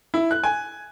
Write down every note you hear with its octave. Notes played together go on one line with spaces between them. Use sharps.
E4
F#6
G#5